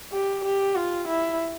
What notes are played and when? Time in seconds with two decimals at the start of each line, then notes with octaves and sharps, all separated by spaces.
0.12 G4
0.44 G4
0.75 F4
1.08 E4